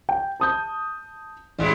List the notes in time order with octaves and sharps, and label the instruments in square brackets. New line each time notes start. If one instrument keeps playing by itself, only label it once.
[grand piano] G5
A5 D#6 G6
[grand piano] A1 [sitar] G3 G#3 E4